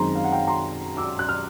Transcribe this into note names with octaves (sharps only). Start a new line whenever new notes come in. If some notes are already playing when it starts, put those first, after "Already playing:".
Already playing: F#2 D#3 G#3 C4 A#5 C6
F5
F#5
F5 G5
A#5 C6
D6 E6
F#6
F6